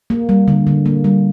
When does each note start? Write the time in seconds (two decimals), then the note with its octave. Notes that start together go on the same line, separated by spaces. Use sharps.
0.10 A#3
0.29 G3
0.48 D3
0.67 D3
0.86 A#3
1.04 G3